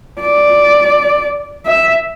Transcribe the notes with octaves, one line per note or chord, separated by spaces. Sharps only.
D5
E5